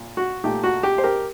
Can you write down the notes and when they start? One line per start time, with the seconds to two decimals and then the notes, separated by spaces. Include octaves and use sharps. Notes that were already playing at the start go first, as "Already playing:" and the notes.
Already playing: A#2
0.17 F#4
0.44 A#2 A3 D#4 G4
0.64 F#4
0.83 G4
0.98 C5
1.04 G4 A#4